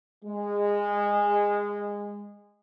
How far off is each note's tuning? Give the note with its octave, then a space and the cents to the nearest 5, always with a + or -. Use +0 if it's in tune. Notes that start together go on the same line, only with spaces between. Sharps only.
G#3 -20